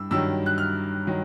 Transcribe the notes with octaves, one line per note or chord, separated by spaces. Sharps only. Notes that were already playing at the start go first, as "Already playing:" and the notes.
Already playing: G2 E6
G2 D#3 F#3 E6
F#6
F6
D#3 F#3